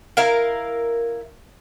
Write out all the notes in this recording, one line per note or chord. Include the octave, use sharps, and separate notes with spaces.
E4 A#4 F5